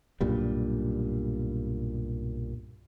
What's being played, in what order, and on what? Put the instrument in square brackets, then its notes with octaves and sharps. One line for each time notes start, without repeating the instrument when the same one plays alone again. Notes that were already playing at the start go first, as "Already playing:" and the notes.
[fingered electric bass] B1 G2 A#2 G3